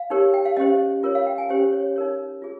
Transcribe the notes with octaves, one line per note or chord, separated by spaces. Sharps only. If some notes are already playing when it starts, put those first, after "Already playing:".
Already playing: F5
D#4 G4 A#4 C#5
G5
F5
C#4 G4 C5 D#5
F4 A#4 C#5
F5
G5
G#5
C#4 G4 C5 G#5
C#5
D#4 A#4 C#5
F4 G#4